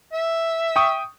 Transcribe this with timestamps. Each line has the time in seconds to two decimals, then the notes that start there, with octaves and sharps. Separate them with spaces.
0.13 E5
0.76 G5 C#6 D#6